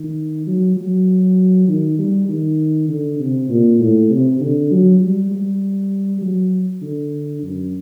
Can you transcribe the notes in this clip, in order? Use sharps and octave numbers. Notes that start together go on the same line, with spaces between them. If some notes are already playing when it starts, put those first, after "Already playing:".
Already playing: D#3
F#3
F#3
D#3
G3
D#3
D3
C3
A#2
A2
C3
D3
F#3
G3
G3
F#3
D3
F#2